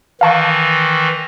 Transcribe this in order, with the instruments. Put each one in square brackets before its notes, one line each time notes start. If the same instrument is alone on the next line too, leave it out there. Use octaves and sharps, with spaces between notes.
[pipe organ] D#3 E3 [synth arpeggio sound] F5 A5 C#6